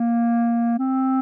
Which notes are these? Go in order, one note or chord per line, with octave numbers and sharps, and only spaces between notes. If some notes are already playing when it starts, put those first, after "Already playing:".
Already playing: A#3
C4